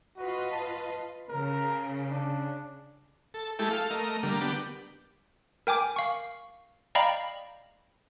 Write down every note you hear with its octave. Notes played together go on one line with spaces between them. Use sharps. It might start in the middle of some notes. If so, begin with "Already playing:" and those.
F4 F#4 B4 D#5
A5
C#3 A#4
D4
A4
G#3 A3 E4 G4 A4
A4 F5
A3 A#4 D#5
D3 G3 A#3
B3 D4 G4
A#4 G5 G#5 D6
F5 C#6
D5 D#5 F5 G5 A#5 B5